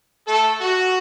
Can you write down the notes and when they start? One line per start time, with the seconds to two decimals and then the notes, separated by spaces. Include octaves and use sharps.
0.26 A3 A4
0.61 F#4